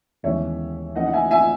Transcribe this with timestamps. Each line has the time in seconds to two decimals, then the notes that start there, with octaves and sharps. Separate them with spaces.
0.23 D#2 C#3 E3 G#3 B3 C#5 E5
0.95 C#3 E3 A#3 D#4 D#5 F#5
1.06 F#5
1.13 E5 G#5
1.31 E5 G#5